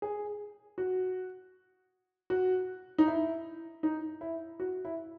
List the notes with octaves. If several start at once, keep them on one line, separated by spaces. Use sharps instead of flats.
G#4
F#4
F#4
D#4
E4
D#4
E4
F#4
E4